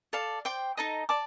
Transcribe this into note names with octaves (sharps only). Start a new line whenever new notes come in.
A4 D5 F5 A5
C5 G5 D6
D#4 A4 D#5 A#5
D5 A5 D6